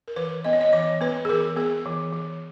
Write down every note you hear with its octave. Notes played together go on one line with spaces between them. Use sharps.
A#4
E3 B4
B3 D#5
C#5
D#5
E3 C#5
B3 B4
G#4
E3 A#4
B3 G#4
E3
E3